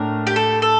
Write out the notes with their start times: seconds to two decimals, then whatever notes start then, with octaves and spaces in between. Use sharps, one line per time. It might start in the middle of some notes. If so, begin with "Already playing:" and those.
Already playing: A2 A3 D4 A#4
0.27 G4
0.36 A4
0.62 A4